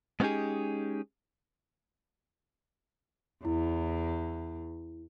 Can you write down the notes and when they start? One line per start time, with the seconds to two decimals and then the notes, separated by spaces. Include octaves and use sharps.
0.20 G#3 B3 C#4 D#4 G4 G#4
3.45 E2 E4